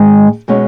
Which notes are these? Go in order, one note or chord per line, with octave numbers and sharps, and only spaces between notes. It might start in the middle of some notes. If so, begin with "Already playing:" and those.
Already playing: G#2 D#3 G#3
B2 G#3 C#4